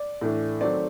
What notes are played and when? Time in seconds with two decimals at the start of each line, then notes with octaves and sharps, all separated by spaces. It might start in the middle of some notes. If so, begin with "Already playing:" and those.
Already playing: D5
0.21 A2 E3 A3 D4
0.61 D#3 F#3 A3 C4 D5